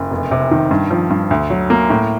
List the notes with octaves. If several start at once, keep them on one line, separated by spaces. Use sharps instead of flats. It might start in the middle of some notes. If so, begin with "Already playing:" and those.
Already playing: F#1
F1
C3
D#3
G2
F3
G2
D2
F#3
A#3
A2